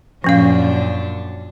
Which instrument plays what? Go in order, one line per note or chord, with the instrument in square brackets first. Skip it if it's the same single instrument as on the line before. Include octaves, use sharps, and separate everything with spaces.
[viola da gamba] F#2 A#2 D4 [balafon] F3 C#4 F5